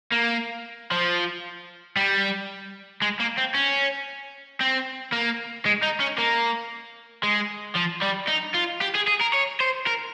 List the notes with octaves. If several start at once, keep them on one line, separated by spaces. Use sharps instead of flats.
A#3
F3
G3
G#3
A#3
C4
C#4
C4
A#3
G#3
D#4
C#4
A#3
G#3
F3
G3
D#4
F4
G4
G#4
G#4
A#4
C#5
C5
A#4